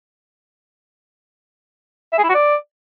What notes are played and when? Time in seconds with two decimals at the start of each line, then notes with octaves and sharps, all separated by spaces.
2.13 E5
2.18 G#4
2.24 E4
2.29 F#4
2.35 D5